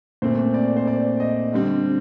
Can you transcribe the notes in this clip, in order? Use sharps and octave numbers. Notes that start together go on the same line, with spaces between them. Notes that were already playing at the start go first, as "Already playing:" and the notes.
A#2 A3 C4 C5
D5
C5
D5
D#5
D3 G3 C4